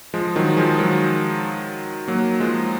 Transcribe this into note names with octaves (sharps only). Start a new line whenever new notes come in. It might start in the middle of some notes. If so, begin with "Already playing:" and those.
F3 G#3
D#3 F#3
F3 G#3
D#3 F#3
F#3 A#3
F3 G#3